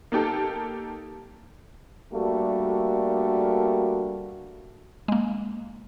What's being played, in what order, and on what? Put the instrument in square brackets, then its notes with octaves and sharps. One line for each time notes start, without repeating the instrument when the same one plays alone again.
[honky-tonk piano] A#3 D#4 G4 A4
[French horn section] G3 A3 A#3 D4 F#4
[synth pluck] G#3 A#3